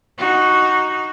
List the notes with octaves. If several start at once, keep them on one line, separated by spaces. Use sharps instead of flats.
D#4 F#4